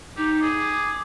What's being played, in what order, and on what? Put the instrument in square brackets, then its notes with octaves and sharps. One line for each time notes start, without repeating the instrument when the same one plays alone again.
[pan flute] D#4 [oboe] G4
[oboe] G#4
[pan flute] D6